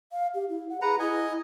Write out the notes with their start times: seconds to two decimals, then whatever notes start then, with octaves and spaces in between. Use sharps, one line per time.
0.12 F5
0.34 G4
0.49 E4
0.69 F#5
0.82 G#4 B4 F#5 A#5
0.99 E4 D#5 G#5